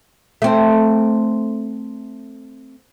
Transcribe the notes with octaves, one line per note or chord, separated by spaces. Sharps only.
A3 C4